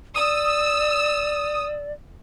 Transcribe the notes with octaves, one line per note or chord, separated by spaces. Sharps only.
D5 D#6 E6